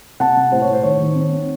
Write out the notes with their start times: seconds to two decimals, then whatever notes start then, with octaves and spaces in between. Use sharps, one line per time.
0.20 C3 F#5 A5
0.37 C3
0.52 A2 C5
0.62 C#5
0.68 A2 C5
0.83 D#3 C#5
1.00 D#3
1.15 C4
1.32 C4